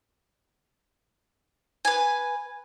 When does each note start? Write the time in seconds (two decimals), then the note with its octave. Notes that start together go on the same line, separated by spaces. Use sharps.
1.85 B4 G#5